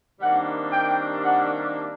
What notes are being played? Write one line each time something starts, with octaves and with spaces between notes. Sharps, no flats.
C3 D#3 G3 A#3 D4 F#5
G5
F#5